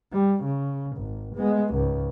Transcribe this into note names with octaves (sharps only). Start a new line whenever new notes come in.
G3
C#3
G#1
G#3 B3
C#2 G#2